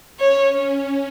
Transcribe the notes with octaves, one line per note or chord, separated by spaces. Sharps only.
C#4 C#5